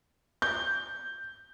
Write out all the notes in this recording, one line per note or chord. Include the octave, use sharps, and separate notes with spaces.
G6